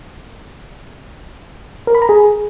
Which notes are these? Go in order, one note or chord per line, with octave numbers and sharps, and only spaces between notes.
A#4
B5
A#5
G#4